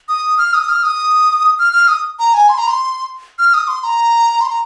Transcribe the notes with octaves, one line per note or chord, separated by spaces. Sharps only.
D#6
F6
D#6
F6
D#6
F6
F6
D#6
A#5
G#5
C6
A#5
C6
F6
D#6
C6
A#5
C6
A#5